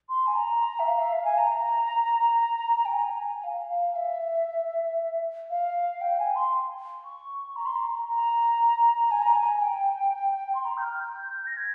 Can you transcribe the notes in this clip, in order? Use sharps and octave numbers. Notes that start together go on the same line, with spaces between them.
C6
G#5
A#5
E5
F5
E5
F5
G#5
A#5
G5
G#5
F5
F5
E5
F5
G5
G#5
C6
C#6
A#5
C6
A#5
A#5
G#5
A#5
G#5
G5
C6
A#5
G6
F6
G6
A#6
G#6